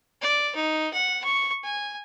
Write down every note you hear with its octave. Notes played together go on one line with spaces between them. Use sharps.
D5
D#4
F#5
C#6
G#5